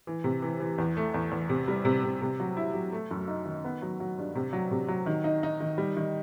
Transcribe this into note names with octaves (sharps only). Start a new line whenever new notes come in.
E3
C3
E3
E3
E2
A3
E2
E2
C3
G3
C3
C3
C3
F#3
E4
F#3
A3
F#2
D#4
D#3
B3
F#3
F#3
G2
C3
F#3
C3
F#3
D#3
D#4
D#4
D#3
G3
D#3